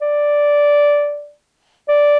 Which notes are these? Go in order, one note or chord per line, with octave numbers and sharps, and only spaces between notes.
D5
D5